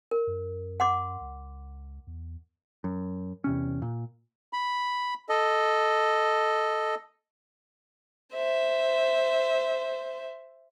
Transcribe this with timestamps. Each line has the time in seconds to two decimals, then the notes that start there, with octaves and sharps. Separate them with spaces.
0.11 A#4
0.27 F#2
0.80 F#5 C6 D6
1.21 C#2
2.07 E2
2.84 F#2
3.44 E2 C3 C#4
3.82 A#2
4.53 B5
5.29 A4 D#5
8.33 C5 E5